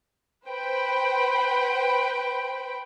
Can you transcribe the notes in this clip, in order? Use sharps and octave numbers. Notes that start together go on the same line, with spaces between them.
B4 C5 G5 B5